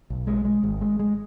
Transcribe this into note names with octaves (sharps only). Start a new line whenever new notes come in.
B1
G#3
G#3
G#1
G#3
G#3